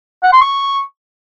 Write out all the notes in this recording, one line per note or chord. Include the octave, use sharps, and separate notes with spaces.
F#5
C6
C#6